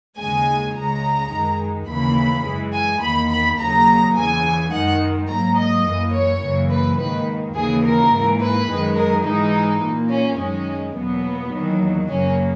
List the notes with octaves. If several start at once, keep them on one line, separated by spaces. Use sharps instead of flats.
D#2 C#3 G#3 G#5
C#2 C#3 G#3 A#5
F#2 D#3 G#3
D#2 C#3 E3 A#3 B5
F#2 E3 G#3
G#5
E2 D#3 A#3 B5
B5
D#2 C#3 F#3 A#3 A#5
E2 C#3 E3 G#5
F#2 D#3 G#3 F#5
G#2 F#3 A#3 A#5
D#5
F#2 E3 A#3
C#5
F#2 C#3 E3 A#3
B4
G#2 D#3 A#3 B4
D#2 C#3 E3 A#3 G#4
A#4
G#2 E3 A#3
B4
F#2 D#3 G#3
A#4
G#2 E3 G#3 D#4
A#2 A#3
C#4
F#2 D#3 G#3 C#4
E2 B2 F#3 A#3 B3
E2 D#3 F#3 A#3
F#2 C#3 F#3 A#3 C#4